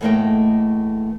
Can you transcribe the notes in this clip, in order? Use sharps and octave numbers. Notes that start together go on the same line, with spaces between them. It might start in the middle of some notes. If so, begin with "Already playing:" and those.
E2 A2 A3 A#3 D#5 G5